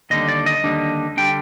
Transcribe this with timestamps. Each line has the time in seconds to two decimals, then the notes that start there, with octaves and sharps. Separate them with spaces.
0.10 D#2 D3 G3 D4 D#5
0.29 D5
0.46 D#5
0.64 D#2 D3 G3 D4
1.17 D3 G3 D4 G5